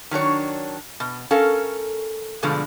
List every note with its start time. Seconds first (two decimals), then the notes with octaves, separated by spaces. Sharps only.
0.11 D#3 F#3 D4 C#5
1.00 B2
1.31 C#4 A4 A#4 F5
2.43 G2 B2 D3 F3 G#3